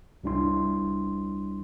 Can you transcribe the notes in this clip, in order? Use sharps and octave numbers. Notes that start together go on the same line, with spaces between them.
C2 G3 D4 E4 C6